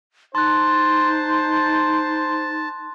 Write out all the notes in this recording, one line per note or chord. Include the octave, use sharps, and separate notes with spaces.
D#4 C5 A5 C6 F#6